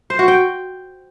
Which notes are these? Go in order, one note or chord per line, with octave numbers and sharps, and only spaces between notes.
C5
F#4
G5